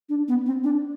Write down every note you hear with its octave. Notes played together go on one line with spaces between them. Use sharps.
D4
B3
C4
D4